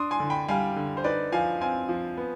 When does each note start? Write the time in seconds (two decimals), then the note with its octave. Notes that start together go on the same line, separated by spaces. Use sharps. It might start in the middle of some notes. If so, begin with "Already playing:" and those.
Already playing: D4 C6 D#6
0.11 G#5 C6
0.20 D3
0.30 G5 B5
0.48 G3 F5 G#5
0.76 D3
0.97 C5
1.04 D#4 B4 D5
1.32 F3 F5 G#5
1.61 C4 F5 G#5
1.89 F3
2.17 B3